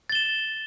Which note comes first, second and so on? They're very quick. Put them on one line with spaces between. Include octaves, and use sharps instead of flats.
A6 G7 E7